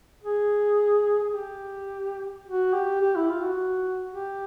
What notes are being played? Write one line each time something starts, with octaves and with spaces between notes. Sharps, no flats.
G#4
G#4
G4
F#4
G4
G4
E4
F4
F#4
G4